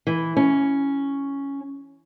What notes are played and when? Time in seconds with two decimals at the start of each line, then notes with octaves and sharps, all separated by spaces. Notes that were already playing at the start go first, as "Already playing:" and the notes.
0.07 E3
0.37 C#4